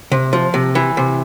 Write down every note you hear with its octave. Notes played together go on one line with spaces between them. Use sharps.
C3
F3
C3
E3
C3